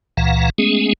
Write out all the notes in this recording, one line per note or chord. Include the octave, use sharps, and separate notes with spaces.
C#2 A#2 E3 F5 F#5 A#5
G#3 A3 B3 C#4 G#4